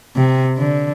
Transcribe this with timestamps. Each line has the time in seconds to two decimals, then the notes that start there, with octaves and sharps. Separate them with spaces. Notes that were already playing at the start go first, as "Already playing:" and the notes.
0.16 C3
0.58 D3